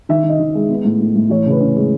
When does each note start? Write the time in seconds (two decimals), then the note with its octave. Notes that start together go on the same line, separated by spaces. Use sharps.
0.09 D#3 E5
0.24 D#3
0.29 D#5
0.39 D#3
0.55 G#3
0.69 B3
0.85 A2
1.00 A2
1.16 A2
1.30 E3 C#5
1.46 C#3 B4
1.61 C#4
1.76 G#3